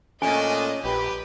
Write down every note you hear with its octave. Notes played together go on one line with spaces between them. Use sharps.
A#2 A3 C#4 D4 D#5 G#5
A#1 G4 B4